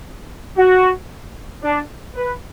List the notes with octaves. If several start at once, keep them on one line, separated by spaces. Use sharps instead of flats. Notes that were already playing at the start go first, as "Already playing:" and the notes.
F#4
D4
B4